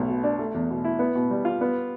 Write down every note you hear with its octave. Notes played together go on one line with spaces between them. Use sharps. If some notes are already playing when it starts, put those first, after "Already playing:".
Already playing: B1 A3
B2
D4
A3
E2
B2
E4
B3
B2
G3
F4
B3